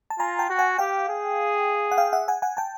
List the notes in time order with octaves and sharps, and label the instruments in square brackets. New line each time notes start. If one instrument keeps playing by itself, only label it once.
[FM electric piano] A5
[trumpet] F4 [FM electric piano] G#5 A#5
[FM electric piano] G5 A5
[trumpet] F#4
[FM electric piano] F#5 G#5
[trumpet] G4 [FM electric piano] F5 G5
[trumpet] G#4
[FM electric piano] F#5
F5 G5
E5 F#5
F#5 G#5
F#5 G#5
G5 A5